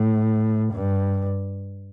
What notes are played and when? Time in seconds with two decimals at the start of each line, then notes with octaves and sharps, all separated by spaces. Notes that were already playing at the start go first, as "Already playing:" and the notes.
Already playing: A2
0.73 G2